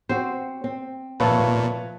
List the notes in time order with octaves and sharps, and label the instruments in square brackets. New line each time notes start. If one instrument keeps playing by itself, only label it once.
[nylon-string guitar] C4 F#4 [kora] C5
[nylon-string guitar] C4
[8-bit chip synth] A#2 [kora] F3 A3 A4 [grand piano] B4 C#5 A5